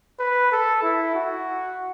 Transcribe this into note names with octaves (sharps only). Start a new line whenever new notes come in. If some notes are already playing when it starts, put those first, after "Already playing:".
B4
A4
E4
F#4